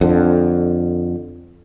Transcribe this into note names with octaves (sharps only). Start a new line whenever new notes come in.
F2 D3